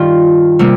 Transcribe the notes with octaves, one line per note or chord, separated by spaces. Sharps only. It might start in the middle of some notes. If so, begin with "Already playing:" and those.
Already playing: G2 D#3 F4 G4
C3 G3 A#3